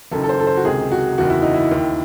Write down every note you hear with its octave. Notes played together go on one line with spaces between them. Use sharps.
F#1 F#2 D#3 A4
A4
C5
A4
C5
F#4
C#2 C3 D#3 G#4
F#4
F#1 E2 D#3 F#4
E4
D#4
E4
D#2 D#3